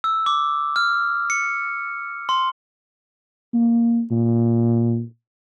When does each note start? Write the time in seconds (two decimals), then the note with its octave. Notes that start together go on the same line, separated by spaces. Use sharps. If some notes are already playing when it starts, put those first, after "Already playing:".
0.04 E6
0.26 D6
0.76 F6
1.30 C#7
2.29 C6
3.54 A#3
4.11 A#2